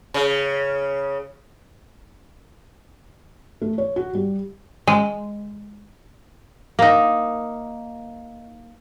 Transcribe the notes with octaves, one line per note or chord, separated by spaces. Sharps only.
C#3
A3
C#5
F#4
G3
G#3
A#3 D#4